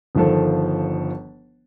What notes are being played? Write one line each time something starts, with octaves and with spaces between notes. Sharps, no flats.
G1 D#3 F3 A4